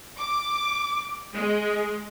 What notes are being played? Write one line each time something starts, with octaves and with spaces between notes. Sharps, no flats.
D6
G#3